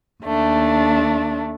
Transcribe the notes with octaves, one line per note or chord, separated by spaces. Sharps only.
D#2 A3 D4